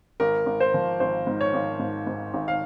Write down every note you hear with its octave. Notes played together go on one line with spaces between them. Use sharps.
G#1 A#4
G#1
C5
F3
G#1 C5
G#2
C#5
G#1
G#2
G#2
G#1
F5